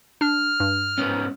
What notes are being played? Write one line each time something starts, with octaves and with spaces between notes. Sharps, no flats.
D4 F6
G2
G#2 B3 C#4